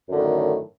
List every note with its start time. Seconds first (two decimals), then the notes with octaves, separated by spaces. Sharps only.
0.07 F#2
0.11 D3
0.14 A2
0.18 D#3